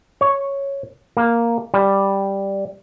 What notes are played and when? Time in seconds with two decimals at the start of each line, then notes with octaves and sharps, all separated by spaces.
0.21 C#5
1.17 A#3
1.74 G3